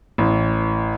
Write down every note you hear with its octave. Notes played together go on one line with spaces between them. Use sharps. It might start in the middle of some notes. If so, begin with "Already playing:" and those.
A1